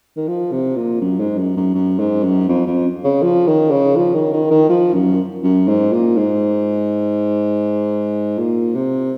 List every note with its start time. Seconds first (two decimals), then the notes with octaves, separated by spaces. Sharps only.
0.16 D#3
0.28 F3
0.52 C3
0.76 A#2
1.01 F#2
1.20 G#2
1.38 F#2
1.56 F#2
1.75 F#2
1.99 G#2
2.24 F#2
2.49 F2
2.67 F2
3.04 C#3
3.22 F3
3.47 D#3
3.71 C#3
3.96 F3
4.14 D#3
4.33 D#3
4.51 D#3
4.69 F3
4.94 F#2
5.43 F#2
5.68 G#2
5.92 A#2
6.17 G#2
8.38 A#2
8.75 C3